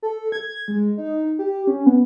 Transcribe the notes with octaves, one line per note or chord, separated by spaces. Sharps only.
A4
G#6
G#3
D#4
G4
C#4
B3